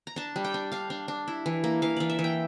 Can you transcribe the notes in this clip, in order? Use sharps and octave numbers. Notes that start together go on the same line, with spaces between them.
A#5
D4 A5
G3
G5
D4
D4 F5
D4
D4
E4
E3
A#3
E3 F5
E3 D5
E5
E3
G5